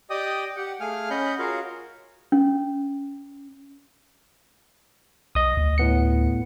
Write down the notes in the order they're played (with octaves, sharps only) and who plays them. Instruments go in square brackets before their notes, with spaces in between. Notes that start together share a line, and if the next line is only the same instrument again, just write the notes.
[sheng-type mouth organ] G4 D5 D#5 G5 D#6
G4 F#5
A3 G#4 F5 G#5 F6
C#4 D#5 F#5 B5 G6
F4 F#4 G#4 A#4 C#5 F5
[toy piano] C#4
[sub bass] B1 [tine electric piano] D#5 D#6
[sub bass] D2
[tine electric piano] A2 B3 C#7